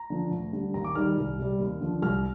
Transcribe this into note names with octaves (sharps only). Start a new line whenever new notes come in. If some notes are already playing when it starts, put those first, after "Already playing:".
Already playing: A#5
D3 F3
D2
D3 G3
D#2 A#5
D6
D#3 G3 F6
C2
C3 G3
D#2
D3 F3
C2 F6